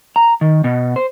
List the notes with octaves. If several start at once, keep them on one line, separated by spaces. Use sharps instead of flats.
A#5
D#3
B2
C5